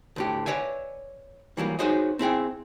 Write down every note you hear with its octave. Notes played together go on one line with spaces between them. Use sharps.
D2 A2 G4
B4 C#5 D5 E5 G#5
E3 F#3 G3 A#3
D#4 F#4 G#4 C5 C#5 D#5
C4 E4 G#4 G5